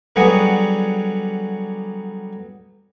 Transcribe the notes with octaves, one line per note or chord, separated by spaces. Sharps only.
D3 F#3 G3 B3 G#4 F#5